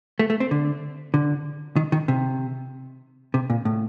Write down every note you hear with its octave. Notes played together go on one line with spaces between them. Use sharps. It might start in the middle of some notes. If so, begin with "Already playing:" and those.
A3
A3
C4
D3
D3
D#3
D#3
C3
C3
A#2
A2